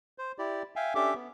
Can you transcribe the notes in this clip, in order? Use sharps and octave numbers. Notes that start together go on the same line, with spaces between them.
C5
E4 G4 D5
E5 F5 G5 G#5
C#4 D4 G4 A4 E5 D6
B3